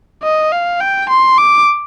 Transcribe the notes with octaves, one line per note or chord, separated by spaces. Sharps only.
D#5
F5
G5
C6
D6